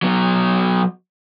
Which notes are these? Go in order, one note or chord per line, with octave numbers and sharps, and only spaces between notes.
F#3 B3